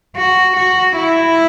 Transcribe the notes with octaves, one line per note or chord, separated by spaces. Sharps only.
F#4
F#4
E4